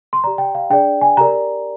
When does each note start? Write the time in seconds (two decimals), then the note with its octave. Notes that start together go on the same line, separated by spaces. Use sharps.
0.13 C6
0.24 G4 D5 A#5
0.38 G5
0.55 F5
0.70 D4 G#4 D5 G5
1.01 G#5
1.17 G4 A#4 D5 A#5